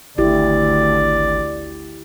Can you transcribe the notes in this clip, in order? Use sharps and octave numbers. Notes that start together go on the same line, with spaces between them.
G#1 D2 E4 G4 D5